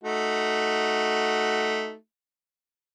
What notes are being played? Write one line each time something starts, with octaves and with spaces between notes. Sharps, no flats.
A3 D#4 F#4